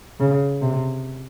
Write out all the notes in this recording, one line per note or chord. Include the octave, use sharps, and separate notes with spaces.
C#3
C3